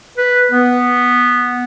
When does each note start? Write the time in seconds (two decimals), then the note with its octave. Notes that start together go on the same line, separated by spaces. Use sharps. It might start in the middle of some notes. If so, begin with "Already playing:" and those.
0.18 B4
0.52 B3